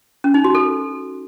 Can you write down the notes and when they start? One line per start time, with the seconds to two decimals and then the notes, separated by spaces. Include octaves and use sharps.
0.24 C#4
0.34 D#4
0.44 F#4
0.55 A4